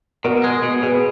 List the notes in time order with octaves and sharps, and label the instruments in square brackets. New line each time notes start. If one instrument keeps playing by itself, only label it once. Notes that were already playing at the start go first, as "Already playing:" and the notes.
[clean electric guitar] B2 [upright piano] F#4 A#4
[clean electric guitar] G#3
B2
[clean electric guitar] B2 [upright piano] G#4 B4